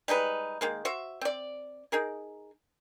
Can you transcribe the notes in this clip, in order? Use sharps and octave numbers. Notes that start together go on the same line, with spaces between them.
G3 G#3 D#4 B4
D#3 G#3 A#3
F#4 C5 E5
C4 D5
D#4 G#4 A#4